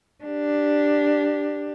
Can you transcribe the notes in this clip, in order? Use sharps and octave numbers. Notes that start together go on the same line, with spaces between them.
D4 G4